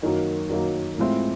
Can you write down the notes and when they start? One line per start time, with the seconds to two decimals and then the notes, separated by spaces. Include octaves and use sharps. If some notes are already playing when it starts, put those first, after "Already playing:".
0.02 F#2 D#3 F#3 A#3
0.49 F#2 D#3 F#3 A#3
0.98 A2 F3 G#3 C4 E4